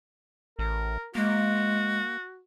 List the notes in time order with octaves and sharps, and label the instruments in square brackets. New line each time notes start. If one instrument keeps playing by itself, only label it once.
[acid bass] A1 [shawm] A#4
[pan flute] G#3 [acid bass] A#3 [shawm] F#4